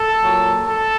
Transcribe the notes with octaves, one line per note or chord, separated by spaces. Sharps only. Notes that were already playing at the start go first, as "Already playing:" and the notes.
Already playing: A4
A#2 F#3
A4